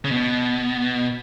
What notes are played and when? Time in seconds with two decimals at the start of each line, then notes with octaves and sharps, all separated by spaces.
0.04 C#3
0.11 B2